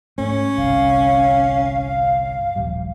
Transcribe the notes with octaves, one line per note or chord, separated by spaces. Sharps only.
G#2 A3 C#4
G1 C2 F5
D#1 A#1 G3